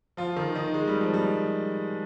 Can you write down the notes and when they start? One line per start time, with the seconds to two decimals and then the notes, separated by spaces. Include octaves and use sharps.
0.17 F3 F4
0.36 D#3 D#4
0.55 D#3 D#4
0.74 G#3
0.88 G3
1.01 F3
1.14 G3